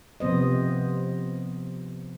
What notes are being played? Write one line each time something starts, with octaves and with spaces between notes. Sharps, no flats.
C3 F3 B3 C5 D#5